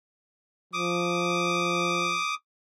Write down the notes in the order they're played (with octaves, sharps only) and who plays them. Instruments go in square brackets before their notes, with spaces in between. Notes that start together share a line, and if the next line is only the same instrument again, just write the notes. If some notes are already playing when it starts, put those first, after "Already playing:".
[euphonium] F3 [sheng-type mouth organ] D6 D#6